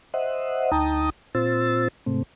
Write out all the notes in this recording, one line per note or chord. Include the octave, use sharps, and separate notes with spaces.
C5 D#5 E5 F#5
D2 D#4 G5 A5 A#5 D#6
A#2 C4 F4 C5 E6 A6
G#2 C3 A3 C4